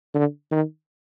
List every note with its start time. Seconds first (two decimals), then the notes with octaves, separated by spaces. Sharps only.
0.14 D3
0.52 D#3